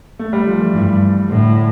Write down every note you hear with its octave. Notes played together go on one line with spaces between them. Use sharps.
A3
G3
F3
E3
G2
A2 D3